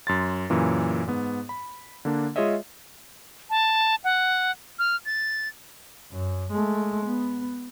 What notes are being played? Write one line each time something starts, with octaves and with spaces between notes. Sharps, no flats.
F#2 C6 A6
F#2 A#2 C#3 E3
G#2 B3
B5
D3 A#3 D4
G#3 F4 G#4 C#5 D#5 E5
A5
F#5
F6
A6
F#2
G#3 A3
B3